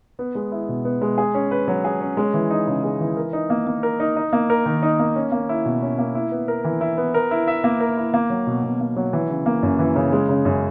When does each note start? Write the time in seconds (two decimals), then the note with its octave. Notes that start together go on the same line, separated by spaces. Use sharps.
0.19 B3
0.35 G#3
0.52 E4
0.68 B2
0.85 B3
1.02 G#3
1.18 G#4
1.34 C#4
1.51 B4
1.68 F#3
1.84 G#4
2.01 C#4
2.17 G#3
2.34 E3
2.50 D#4
2.67 C#3
2.84 G#3
3.01 E3
3.17 A#4
3.33 D#4
3.50 A#3
3.67 A#3
3.83 A#4
4.00 D#4
4.16 D#4
4.33 A#3
4.50 A#4
4.66 D#3
4.83 D#4
4.99 A#3
5.16 C#4
5.32 A#3
5.49 E4
5.65 B2
5.82 C#4
5.98 A#3
6.15 E4
6.32 B3
6.48 A#4
6.65 E3
6.81 E4
6.98 B3
7.14 A#4
7.31 E4
7.47 E5
7.64 A#3
7.80 A#4
7.97 E4
8.14 A#3
8.30 F#3
8.47 B2
8.64 B2
8.81 A#3
8.96 F#3
9.13 E3
9.30 C#3
9.46 A#3
9.63 F#2
9.79 E3
9.96 C#3
10.12 G#3
10.29 C#3
10.45 F#2